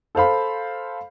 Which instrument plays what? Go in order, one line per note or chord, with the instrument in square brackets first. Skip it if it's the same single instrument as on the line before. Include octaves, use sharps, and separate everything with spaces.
[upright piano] A4 C5 F5 B5